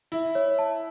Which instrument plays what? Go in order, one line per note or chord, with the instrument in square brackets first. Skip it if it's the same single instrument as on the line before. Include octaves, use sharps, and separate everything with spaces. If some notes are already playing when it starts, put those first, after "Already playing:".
[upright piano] E4 [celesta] E5
[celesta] C#5
A5